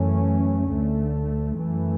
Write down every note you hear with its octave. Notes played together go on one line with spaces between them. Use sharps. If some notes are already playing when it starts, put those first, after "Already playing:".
Already playing: F#2 E3 A3 C#4
D2 D3 A3
F#2 E3 A3